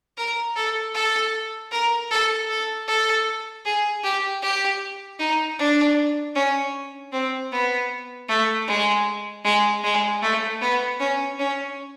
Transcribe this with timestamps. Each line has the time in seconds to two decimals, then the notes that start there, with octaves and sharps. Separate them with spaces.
0.18 A#4
0.56 A4
0.94 A4
1.71 A#4
2.11 A4
2.50 A4
2.88 A4
3.65 G#4
4.04 G4
4.42 G4
5.19 D#4
5.59 D4
6.35 C#4
7.12 C4
7.52 B3
8.29 A3
8.68 G#3
9.44 G#3
9.84 G#3
10.22 A3
10.61 B3
11.00 C#4
11.39 C#4